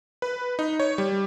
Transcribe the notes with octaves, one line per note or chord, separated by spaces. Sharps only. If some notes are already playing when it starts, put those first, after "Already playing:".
B4
D#4
C#5
G3